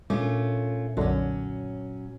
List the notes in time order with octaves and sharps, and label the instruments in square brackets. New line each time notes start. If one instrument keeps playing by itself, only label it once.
[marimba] A#2 D4 [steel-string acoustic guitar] A3 C#4 F4
[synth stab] B1 F#2 D3 [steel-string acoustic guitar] F#3 C#4